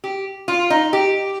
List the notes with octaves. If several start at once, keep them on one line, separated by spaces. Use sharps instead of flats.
G4
F4
D#4
G4